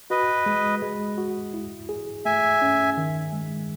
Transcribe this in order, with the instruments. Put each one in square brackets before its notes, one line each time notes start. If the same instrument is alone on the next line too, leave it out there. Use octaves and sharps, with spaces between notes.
[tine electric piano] F#4 [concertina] B4 D#5
[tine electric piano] G#3
G#3
F#4
E4
G#4
[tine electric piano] A3 [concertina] E5 G#5
[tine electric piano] C#4
D#3
G#3